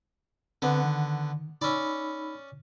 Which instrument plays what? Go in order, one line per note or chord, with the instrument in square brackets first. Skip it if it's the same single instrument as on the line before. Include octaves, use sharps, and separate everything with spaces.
[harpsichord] D3 B3 [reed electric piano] C4 B4
[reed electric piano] D#3
[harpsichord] C#4 D5 [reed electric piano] D#4 B5 E6